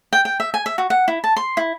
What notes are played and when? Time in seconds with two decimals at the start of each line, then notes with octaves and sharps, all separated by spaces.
0.13 G5
0.25 G5
0.40 E5
0.54 G#5
0.66 E5
0.78 F#4
0.90 F#5
1.08 E4
1.24 A5
1.37 C6
1.57 E4